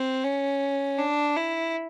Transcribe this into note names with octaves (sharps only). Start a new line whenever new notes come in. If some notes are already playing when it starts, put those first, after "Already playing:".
Already playing: C4
C#4
D4
E4